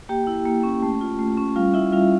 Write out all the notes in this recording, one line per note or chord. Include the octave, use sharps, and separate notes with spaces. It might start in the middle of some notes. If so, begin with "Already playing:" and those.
A#3 G4 G5
E4
A#3
C#4
A3
F4
A3
C#4
G3 F4 F5
E4 F4 E5
G3 F4 F5